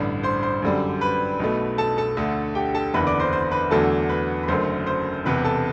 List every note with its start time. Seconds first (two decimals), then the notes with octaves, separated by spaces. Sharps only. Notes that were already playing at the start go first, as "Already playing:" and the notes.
Already playing: A1 G2 D3 D5
0.23 C5 C6
0.43 C5 C6
0.62 F#2 D3 G3
1.01 B4 B5
1.40 B1 B2 A3
1.78 A4 A5
1.98 A4 A5
2.17 D2 D3 A3
2.55 G4 G5
2.74 A4 A5
2.94 F#1 E2 D3 B4 B5
3.07 D5 D6
3.20 C5 C6
3.33 C5 C6
3.51 B4 B5
3.71 E2 D3 F#3 A3 A4 A5
4.09 B4 B5
4.43 B5
4.48 F#1 F#2 D3 A3 C5 C6
4.86 C5 C6
5.25 E1 E2 C3 B4 B5
5.44 A4 A5